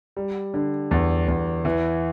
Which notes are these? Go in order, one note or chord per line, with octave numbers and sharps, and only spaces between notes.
G3
D3
E2
E2
E3